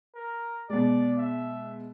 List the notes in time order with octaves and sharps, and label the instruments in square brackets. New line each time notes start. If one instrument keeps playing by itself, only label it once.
[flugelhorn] A#4
[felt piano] B2 G#3 [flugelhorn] D5
[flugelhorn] E5